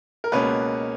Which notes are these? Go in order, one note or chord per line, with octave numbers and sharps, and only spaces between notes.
A#4
C#2 B2 A#3 C#4 B4